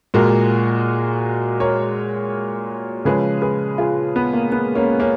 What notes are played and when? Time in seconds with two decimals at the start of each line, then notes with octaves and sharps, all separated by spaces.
0.14 A#2 G#3 F#4 A#4
1.60 A#4 C#5
3.05 C#3 F3 G#3 G#4 B4
3.42 G#4 B4
3.78 F4 G#4
4.16 B3
4.33 A#3
4.52 B3
4.75 A#3 C#4
5.00 A#3 C#4